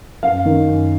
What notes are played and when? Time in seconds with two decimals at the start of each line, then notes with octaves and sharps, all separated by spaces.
0.23 F#2 F5
0.45 D#3
0.68 F#2